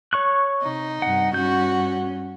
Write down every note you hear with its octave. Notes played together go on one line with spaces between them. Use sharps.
C#5 C#6 F#6
C3 D#4
G2 C3 F#5
G2 C#4 F#4 G6